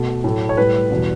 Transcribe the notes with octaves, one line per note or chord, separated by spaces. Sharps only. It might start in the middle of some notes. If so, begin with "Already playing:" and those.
Already playing: B2 A3
A2 F#3 A3
C#5
A2 G3 B4
E2 B2 G3